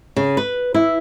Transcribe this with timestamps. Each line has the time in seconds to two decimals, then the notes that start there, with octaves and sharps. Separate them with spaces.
0.16 C#3
0.37 B4
0.74 E4